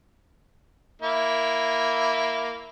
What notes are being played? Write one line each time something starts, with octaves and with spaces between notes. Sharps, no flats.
A#3 E4